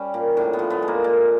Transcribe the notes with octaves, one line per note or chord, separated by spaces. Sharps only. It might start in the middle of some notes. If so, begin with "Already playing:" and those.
Already playing: G3 C#4
A#2
A2 D4
B3
F3
B3
G#3
A#3
A#2